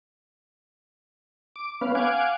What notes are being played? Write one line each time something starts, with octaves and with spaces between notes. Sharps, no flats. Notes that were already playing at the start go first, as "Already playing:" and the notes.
D6
B3 C#4 B4 F5
F5 F#5 G#5 D6